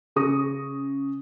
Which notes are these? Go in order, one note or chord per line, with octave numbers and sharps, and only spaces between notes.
C#3 G#4 C#6 D#6 A#6